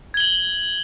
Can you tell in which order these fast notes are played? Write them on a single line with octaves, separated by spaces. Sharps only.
G#6 G7 F#7